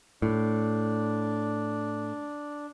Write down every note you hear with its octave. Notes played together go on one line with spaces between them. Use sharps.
A2 D4